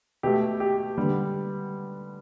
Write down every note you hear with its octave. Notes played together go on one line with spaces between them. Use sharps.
B2 A3 G4
G4
D3 G3 B3